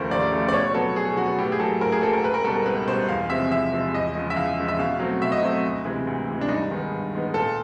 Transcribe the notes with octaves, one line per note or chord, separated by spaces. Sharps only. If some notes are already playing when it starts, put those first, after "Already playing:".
Already playing: D#2 C#3 F3 A3 A#4 C5
D#2 D5
C#3 F3 A3
D5
B2 C#5
F#3 B3 A4
B2 G#4
F#3 B3 F#4
A2 G4
G#4
F#3 A#3 A4
A2 A#4
G#4
F#3 A#3 A4
A#4
C#2 B4
A#4
B2 G3 A4
A#4
C#2 B4
B2 G3 C5
E2 F5
C3 F3 G#3 C4 E5
E2 E5
C3 F3 G#3 C4
E2 D#5
C#3 F3 G#3
E5
E2 F5
C#3 F3 G#3
E5
B2 F5
F#3 A3 C4
B2 E5
D#5
F#3 A3 C4
D2
C3 E3 G#3
D2
C3 E3 G#3
D4
G2 D#4
D#3 G#3 B3
G2
D#3 G#3 B3
A#2 A4